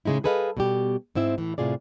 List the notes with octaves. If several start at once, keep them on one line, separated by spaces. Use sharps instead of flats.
A2 C#3 G#3 D#4 E4
G#4 A4 B4 D#5 F5
B2 G3 G4
G#2 C4 E4 E5
A2 E3
A2 C3 F4 G#4 D5